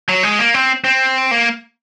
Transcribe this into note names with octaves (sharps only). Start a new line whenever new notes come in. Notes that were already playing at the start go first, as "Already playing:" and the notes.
F#3
G#3
A#3
C4
C4
A#3